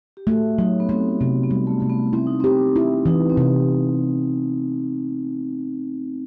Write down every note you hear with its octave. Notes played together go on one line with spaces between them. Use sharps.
G4
A3 F#4
F#3 D#4
B3
A3 C4
C3 B3
B3
G3
A3
C3 A3
B3
C4 E4
D#4
C4 G4
E4
E3 D#4
C4
C3